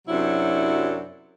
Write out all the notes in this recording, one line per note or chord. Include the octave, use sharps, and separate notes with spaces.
F#2 C3 F#3 D4 E4